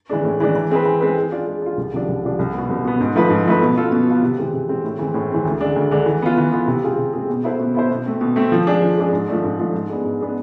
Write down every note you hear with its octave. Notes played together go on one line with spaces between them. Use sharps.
E3 G#3 D4
A2
E3 G#3 D4
E3
G#3 C4 G#4 B4
E3
G#3 C4 G#4 B4
G#3
D4 F4
G#3
D4 F4
C2
C3 F3 G#3 D4
C2
C3 F3 G#3 D4
C2
B2 B3
C2
B2 B3
G#2
F3 A3 E4 B4
G#2
F3 A3 E4 B4
B2
B3 F4 A4
B2
B3 F4 A4
C3
E3 G#3 C4
C3
E3 G#3 C4
A2
E3 G#3 C4
A2
E3 G#3 C4
D2
D3 G#3 D4
D2
D3 G#3 D4
E3
B3 F4
E3
B3 F4
C3
G#3 C4 F4 G#4
C3
G#3 C4 F4 G#4
B2
B3 E4 A4 C5
B2
B3 E4 A4 C5
B2
A3 C4
B2
A3 C4
F3
G#3 D4 G#4
F3
G#3 D4 G#4
G#2
F3 A3 D4
G#2
F3 A3 D4
G#2
G#3 B3 D4 G#4
G#2
G#3 B3 D4 G#4